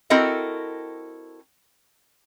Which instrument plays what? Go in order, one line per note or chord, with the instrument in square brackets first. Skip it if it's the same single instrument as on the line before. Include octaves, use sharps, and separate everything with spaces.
[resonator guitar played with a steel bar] C4 E4 F#4 A4 A#4 D#5